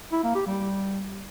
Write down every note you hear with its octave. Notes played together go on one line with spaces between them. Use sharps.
E4
A#3
G4
G3